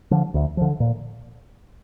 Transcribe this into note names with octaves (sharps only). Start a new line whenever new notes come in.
D3 F3
D2
D3 F3
A#2